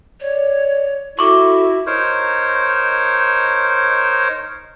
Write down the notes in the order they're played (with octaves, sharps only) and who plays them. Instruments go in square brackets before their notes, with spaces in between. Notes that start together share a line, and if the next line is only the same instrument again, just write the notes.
[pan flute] C#5 [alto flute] D5
[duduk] E4 [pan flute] F#4 [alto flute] A4 [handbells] C#6 D6
[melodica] D#4 A#4 C5 C#5